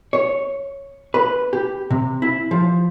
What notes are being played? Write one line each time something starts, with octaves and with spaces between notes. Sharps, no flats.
C#5
B4
G4
C3
E4
F3